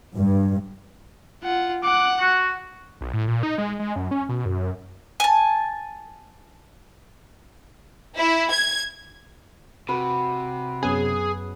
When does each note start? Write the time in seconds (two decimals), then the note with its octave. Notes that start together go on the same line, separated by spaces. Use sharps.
0.16 G2
1.43 F4 F#5
1.83 F#5 D6 F#6
2.20 F#4
3.01 B1
3.13 A2
3.28 A#2
3.43 D#4
3.58 G#3
3.79 G#3
3.96 F#2
4.11 C#4
4.29 B2
4.45 F#2
5.20 G#5 A5
8.17 E4
8.51 G#6
9.89 C3 F#4 B4
10.83 F#2 B3 C#4 G#4